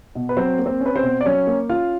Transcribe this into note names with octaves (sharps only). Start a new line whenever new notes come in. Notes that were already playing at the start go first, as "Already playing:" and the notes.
B2
B4
F#3 C4 C5
A#3
C4 C5
C#4
B4
C4 C5
B2
D5
F#3 C#4 C#5
A#3
C#4 F4 F5